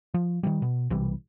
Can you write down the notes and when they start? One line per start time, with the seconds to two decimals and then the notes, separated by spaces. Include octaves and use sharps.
0.14 F3
0.43 D#3 F3 G3
0.62 B2
0.90 B1 C3 E3 G3